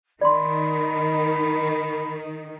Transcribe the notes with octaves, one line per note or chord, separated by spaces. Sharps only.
D#3 D5 B5 C6